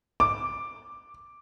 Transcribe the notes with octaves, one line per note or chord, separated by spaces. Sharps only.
D6